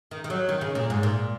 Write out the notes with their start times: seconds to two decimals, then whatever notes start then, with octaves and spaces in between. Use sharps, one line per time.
0.11 D#3
0.24 D#3
0.30 F#3
0.49 D#3
0.61 C#3
0.75 A#2
0.90 G#2
1.03 A#2